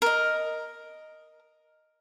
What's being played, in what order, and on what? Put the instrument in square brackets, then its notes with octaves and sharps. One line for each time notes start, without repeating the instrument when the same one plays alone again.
[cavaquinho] A#4 D#5